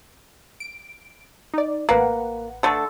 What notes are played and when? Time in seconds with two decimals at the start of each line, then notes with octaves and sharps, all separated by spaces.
0.60 D7
1.54 D#4 D5
1.89 A1 A#3 B4 F#5
2.63 D3 A3 A4